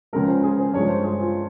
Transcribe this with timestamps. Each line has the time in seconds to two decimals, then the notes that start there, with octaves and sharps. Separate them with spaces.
0.13 C#2 C#3 F3 G#3 A#4
0.28 C5
0.44 G#4
0.59 C5
0.73 G2 F3 G#3 C#5
0.89 C5
1.04 G#4
1.19 F4